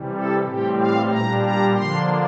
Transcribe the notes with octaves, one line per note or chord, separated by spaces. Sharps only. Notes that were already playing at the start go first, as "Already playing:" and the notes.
Already playing: C3 E3 G3
A4
A2 E3 G3 C4 G4
F5
A#2 G3 D4 A#5
A#5
D3 F3 A#3 D4 C6